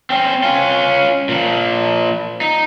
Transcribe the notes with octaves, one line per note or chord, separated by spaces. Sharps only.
C4 C#4
C#4 F4
A#2 F3
D#4